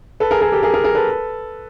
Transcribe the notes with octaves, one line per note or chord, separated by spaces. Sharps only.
A4 B4
G#4 A#4
G#4 A#4
G4 A4
G#4 A#4
G#4 A#4
G#4 A#4
A4 B4